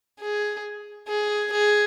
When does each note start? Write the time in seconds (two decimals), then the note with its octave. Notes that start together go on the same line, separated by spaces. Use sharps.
0.20 G#4
1.08 G#4
1.53 G#4